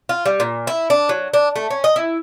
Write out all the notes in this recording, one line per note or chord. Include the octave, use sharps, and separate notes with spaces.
F4
G3
A#2
E4
D4
F#3
D4
A3
C#4
D#5
E4